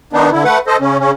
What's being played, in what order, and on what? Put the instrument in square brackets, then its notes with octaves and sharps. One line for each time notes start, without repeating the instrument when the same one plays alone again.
[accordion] D#3 B3 D4 D#4
D3 E4
A3 B4 F#5
A4 C5 D#5
C#3 C#4
C#3 C#4